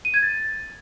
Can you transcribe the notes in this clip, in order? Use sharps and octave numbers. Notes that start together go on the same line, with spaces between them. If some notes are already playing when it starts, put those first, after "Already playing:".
D#7
G#6
A6